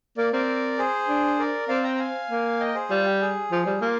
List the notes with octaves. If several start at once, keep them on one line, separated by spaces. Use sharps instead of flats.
A#3 A#4 D5
C4 A#4 D5
G#4 C5
D4
A#4 D5
C4 D5 F5
G5 A#5
A#5
F5 G#5
A#3
D#5 G5
A#4
G#4 C5
G3 F4
G4
G#4
F3
G3
A#3 F4